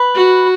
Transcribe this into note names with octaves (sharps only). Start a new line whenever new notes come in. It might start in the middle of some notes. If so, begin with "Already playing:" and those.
Already playing: B4 B5
F#4